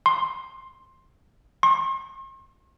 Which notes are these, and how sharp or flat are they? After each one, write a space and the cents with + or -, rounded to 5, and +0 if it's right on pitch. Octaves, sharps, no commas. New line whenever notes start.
C6 +15
C6 +45